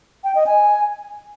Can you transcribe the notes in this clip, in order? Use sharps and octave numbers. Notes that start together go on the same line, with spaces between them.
G5
D#5
G#5